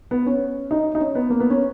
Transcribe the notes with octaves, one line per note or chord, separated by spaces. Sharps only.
B3
C#4
D#4
D#4
C#4
B3
A#3
B3
C#4